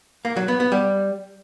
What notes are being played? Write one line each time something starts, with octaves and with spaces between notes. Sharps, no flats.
A#3
F#3
B3
B3
G3